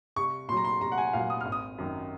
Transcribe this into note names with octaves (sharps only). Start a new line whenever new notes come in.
C2 C#6
A#2 F#3 A#5 C6
C6
C2 A#5
F#5
G#5
A#2 F#3 F5
D#6
G#1 F6
D#6
F#2 D#3